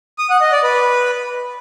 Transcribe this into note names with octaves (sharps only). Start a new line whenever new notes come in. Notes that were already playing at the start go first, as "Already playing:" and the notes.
D#6
F#5
D#5
D5
B4